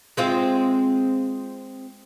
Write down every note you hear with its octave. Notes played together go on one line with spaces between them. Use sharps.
G#3 C4 F4